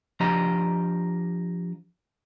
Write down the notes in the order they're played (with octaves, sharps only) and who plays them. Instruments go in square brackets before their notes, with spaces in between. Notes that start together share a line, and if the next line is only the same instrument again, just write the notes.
[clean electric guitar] F3 D4 G4 D#5 A#5